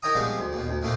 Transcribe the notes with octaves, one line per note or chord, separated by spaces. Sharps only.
D#4 A#4 C#5 G5 A#5 D#6
F3 G3 G#3 B3 C4
D2
D#2 B2
D2
A#2 D#3 A3 A#3 C4